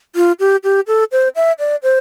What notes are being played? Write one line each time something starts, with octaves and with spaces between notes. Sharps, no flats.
F4
G4
G4
A4
C5
E5
D5
C5